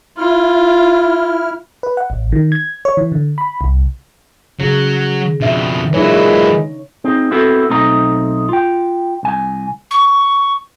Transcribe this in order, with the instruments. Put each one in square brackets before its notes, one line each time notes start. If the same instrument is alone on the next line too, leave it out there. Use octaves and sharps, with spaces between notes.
[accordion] E4 F6 [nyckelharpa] F4
[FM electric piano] B4
F#5
A1
D#3
G#6
C#5
E3
D3
B5
C2
[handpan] C#3 [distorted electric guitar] F#3 F#4
[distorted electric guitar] F2 B2 [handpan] D4 E5
[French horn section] A#2 E3 G#3 [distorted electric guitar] F#3 E4 [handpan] D#4 C#5
[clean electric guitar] C4 D#4 G#4
B3 C4 E4 F#4 A4
B1 A3 C4 D#4 A#5
F4 G5
C2 G#5
[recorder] C#6